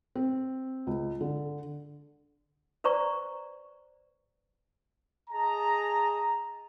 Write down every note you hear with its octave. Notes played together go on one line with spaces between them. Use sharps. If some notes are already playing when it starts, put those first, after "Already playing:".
C4
C#2
D3
B4 C5 D5 A#5 C#6
G#4 D#5 A5 A#5